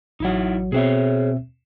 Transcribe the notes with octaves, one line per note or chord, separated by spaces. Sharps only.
A1 F#3 D#4 E4 F#5
B2 C4 G#4 C5 C#5 E5